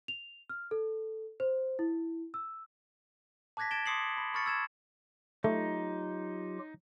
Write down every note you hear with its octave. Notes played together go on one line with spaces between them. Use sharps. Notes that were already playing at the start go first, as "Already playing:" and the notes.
F7
F6
A4
C5
E4
E6
A5 D6 F#6 G#6 A#6 B6
G#6 A6 D7 E7 G7
C6 D6 D#6 C7 C#7 F#7
B5
B5 C#6 F6 A6 C#7
E6 G#6 E7
F#3 A3 D#4 F4 G4